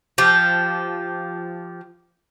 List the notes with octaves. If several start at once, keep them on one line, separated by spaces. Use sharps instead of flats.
F3 G4